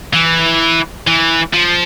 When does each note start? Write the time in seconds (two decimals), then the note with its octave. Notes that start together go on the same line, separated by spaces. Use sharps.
0.13 E3
1.07 E3
1.53 F3